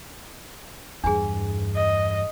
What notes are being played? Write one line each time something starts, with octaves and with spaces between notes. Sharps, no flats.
E2 G2 D4 G#4
D#5